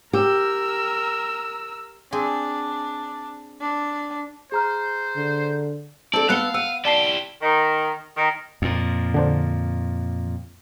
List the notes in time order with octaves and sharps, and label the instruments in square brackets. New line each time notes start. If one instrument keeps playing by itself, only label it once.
[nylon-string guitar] G4 [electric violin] A#4 E6
[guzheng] C4 G#4 [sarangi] D4
[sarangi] D4
[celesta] G#4 A#5 F6 [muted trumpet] C5
[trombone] D3
[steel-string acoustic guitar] C4 A4 [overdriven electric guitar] D5 [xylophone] A5 [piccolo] E6
[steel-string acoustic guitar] B3 F#5 A5 [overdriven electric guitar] F5 [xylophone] F#6 C#7 G7
[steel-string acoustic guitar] F#5 [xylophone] E6 [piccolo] D#7
[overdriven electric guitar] E4 G4 [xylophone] D5 A5 C7 [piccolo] G7
[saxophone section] D#3
D#3
[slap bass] F2 A#2
[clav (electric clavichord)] D3 D4 C5